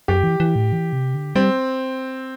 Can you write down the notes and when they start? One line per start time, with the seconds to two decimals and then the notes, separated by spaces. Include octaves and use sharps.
0.08 F#2 G4
0.24 E3
0.40 E3
0.56 A2
0.73 E3
0.93 C3
1.15 D3
1.35 G3 C4